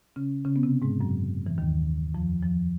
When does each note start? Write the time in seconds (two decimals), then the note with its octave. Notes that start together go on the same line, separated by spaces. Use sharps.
0.16 C#3 C#4
0.45 C#3 C#4
0.56 B3
0.63 C3 C4
0.82 G#2 G#3
1.01 F#2 F#3
1.46 E3
1.58 D#2 D#3
2.14 F2 F3
2.43 F2 F3